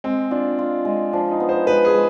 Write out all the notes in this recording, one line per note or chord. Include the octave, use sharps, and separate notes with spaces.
G#3 C4
D4 F4
F4
G#3
F3 D4
D#4
B3
C5
G#3 B4
G#4
G#3